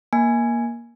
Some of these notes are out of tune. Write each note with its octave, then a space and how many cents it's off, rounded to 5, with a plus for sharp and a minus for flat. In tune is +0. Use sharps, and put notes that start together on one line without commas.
A#3 +15 G#5 +0